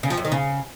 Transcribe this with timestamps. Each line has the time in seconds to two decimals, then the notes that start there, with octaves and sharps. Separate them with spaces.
0.03 C#3
0.10 F3
0.17 F#2
0.25 D#3
0.32 C#3